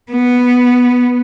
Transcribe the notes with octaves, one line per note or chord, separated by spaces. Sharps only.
B3